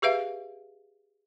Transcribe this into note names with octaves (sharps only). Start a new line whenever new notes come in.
G4 G#4 B4 E5 F5